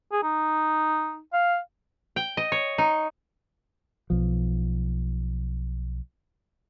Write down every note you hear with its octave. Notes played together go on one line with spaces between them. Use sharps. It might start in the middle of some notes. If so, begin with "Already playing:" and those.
G#4
D#4
F5
G5
D#5
C#5
D#4
B1 F3